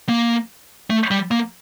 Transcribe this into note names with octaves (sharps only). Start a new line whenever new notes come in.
A#3
A3
G3
A#3